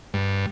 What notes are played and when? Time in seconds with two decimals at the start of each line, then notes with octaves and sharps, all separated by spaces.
0.14 G2